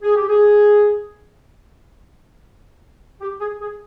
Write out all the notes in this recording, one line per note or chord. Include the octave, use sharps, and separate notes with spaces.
G#4
G4
G#4
G4
G#4
G#4